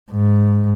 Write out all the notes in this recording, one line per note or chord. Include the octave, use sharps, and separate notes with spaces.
G#2